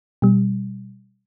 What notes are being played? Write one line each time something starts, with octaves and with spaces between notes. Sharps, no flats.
B2 G3